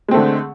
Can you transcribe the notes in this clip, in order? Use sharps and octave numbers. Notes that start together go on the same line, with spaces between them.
D3 G#3 A3 C4